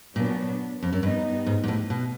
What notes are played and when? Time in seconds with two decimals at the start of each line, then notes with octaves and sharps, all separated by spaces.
0.16 A#2 F#3 B3 D4
0.82 F2
0.93 F#2
1.03 G2 G3 B3 D#4
1.46 G#2
1.64 G#2
1.68 A2
1.90 B2